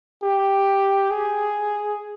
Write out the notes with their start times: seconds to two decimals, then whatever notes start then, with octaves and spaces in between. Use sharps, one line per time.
0.23 G4
1.10 G#4